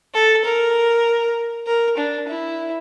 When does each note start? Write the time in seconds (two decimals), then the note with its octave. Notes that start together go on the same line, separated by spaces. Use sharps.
0.14 A4
0.45 A#4
1.67 A#4
1.97 D4
2.28 E4